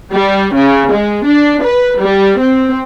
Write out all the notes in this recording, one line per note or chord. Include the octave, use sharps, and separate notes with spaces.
G3
C#3
G#3
D4
B4
G3
C4